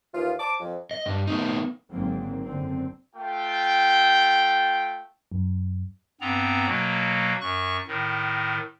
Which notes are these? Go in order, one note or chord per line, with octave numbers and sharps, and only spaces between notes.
D#2 E3 F4
C5 A5 D6
F2
D#5
G2
A3 B3 D#4
G#1 G#2 D3 F#3 A#3 C4
F#1 D3 C4
A3 F4 G5
F#2
G2 B3 C4 A#5
B2 F#3 A#3
F#2 C#6 F#6
A2 D#3